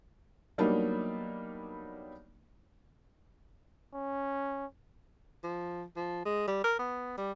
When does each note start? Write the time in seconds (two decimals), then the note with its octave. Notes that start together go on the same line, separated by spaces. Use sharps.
0.58 F#3 G3 A#3 B3 D4 D#4
3.94 C#4
5.44 F3
5.96 F3
6.26 G#3
6.48 G3
6.64 A#4
6.79 B3
7.18 G3